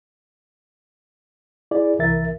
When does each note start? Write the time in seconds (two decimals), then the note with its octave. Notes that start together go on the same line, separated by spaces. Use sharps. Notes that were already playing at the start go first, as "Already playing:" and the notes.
1.71 E4 G#4 D5
1.99 C2 E3 A#4 E5 A6